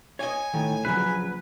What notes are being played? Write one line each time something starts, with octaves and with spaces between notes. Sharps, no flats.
C#5 D#5 G#5
A2 D#3
A#1 C#3 F#3 B4